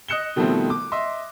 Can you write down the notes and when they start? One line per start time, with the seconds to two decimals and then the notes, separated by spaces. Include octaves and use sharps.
0.08 D#5 D#6 F#6 C#7 E7 G7
0.36 B2 D#3 F3 G3 A3 C4
0.70 D6
0.92 D#5 E5 C6